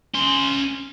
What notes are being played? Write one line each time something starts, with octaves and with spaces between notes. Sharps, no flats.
C#4 C6